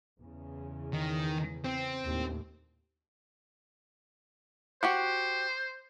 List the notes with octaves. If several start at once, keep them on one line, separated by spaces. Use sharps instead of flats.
E2 C#3
D#3
C4
D#2 A2
F#4 G4 C5 F#5